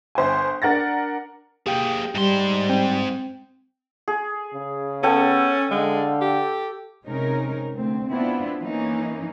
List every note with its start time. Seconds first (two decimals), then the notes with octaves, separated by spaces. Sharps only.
0.15 G1 C5 G5 G#5
0.62 D4 A#4 F#5 A6 A#6
1.67 A#3 G4 G#4 G5
2.15 G#2 G3 C6
2.69 C4 G5
4.08 G#4
4.54 C#3
5.03 B3 C#4 A4 G5
5.71 D3 G#3 F5
6.21 G4
7.06 C3 G#3 C#4 D#4 A#4
7.76 D2 C4
8.11 B3 C4 D4 E4 F4
8.61 E3 A#3 C#4 D#4